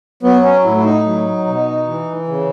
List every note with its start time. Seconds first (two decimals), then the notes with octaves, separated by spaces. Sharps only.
0.23 F#3 B3
0.44 C#4
0.64 A2 E4
0.77 E4
0.84 D#4
1.05 F#3
1.46 B2
1.87 E3
2.28 C#3